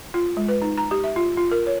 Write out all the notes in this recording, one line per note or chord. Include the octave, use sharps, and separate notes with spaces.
F4
G#3
B4
D#4
A#5
G4
E5
F4
F4
A#4
C#5